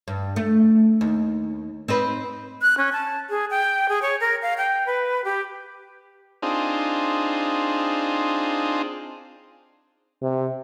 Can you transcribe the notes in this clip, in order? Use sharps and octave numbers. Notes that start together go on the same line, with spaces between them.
G2
A3
D#2
C4 D#4 B4
F#6
C#4
A5
G#4
G5
G#4
C#5
A#4
F5
G5
B4
G4
C4 D4 D#4 F4 G#4
C3